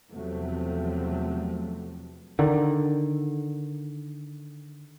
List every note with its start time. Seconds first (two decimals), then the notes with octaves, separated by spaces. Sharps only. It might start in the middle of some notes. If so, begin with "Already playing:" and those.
0.11 E2 C3 F3 F#3 A3
2.39 D3 D#3